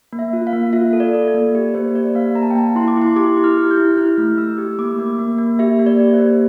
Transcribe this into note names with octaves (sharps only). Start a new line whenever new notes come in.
A#3
E5
F4
F5
A#3
F4 E5
A4
D5
A4
D5
A#3
G4
A#3 C5
G4 D5
A#3 F5
A#3 A#5
A5
G5
A#3 A5
E4 C6
D6
E4 C6
G4 D6
E4
F6
G4
G6
E4
E4 F6
A3
A3 E6
G4
A#3 D6
A#3
A#3
A#3
G4 E5
A#3
D5
G4
C5
A#3